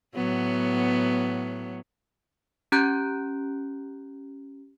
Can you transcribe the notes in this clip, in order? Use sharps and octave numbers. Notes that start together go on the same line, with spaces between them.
A2 F#3 B3
C#4 G4 A#5 F#6 G6 D7